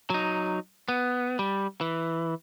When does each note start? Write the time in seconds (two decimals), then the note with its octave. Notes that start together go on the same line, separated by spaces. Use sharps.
0.10 F#3 D#4
0.88 B3
1.39 G3
1.81 E3